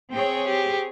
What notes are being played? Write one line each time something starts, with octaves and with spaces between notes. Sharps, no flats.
C4 G#4 C#5 G5
G4